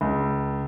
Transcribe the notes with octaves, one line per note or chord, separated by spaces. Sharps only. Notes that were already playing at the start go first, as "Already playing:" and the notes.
C#2